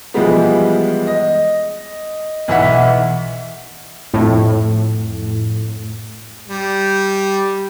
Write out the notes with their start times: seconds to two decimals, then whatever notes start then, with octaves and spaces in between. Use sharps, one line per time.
0.14 E3 F3 G3 G#3 B3
1.07 D#5
2.48 B1 E3 E4 F#5 B6
4.14 F2 A2
6.48 G3